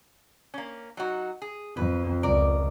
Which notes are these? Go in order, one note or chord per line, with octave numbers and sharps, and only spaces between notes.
A#3 C#4
F#3 D#4 F#4
G#4
F2 B4
C#2 A#4 D5